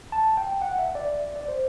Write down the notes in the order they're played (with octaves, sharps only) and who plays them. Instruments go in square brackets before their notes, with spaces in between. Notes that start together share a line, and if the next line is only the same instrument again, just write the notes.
[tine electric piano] A5
G5
F#5
E5
D5
D5
C5